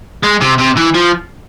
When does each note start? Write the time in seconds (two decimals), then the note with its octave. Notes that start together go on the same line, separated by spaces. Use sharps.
0.24 G#3
0.41 C3
0.59 C3
0.77 E3
0.95 F3